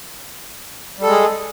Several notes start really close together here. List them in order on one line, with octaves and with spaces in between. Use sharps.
G3 A4 G#3 G#4